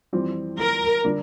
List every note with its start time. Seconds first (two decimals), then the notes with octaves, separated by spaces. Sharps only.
0.13 F2 E3 G3 C4
0.59 A#4
1.04 D3 G3 D4